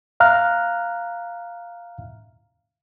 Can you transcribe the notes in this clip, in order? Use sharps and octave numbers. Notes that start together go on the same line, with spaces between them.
E5 F5 A#5 F6 F#6